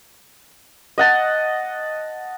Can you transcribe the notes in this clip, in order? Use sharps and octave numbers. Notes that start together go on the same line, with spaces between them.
D#5 F#5 A5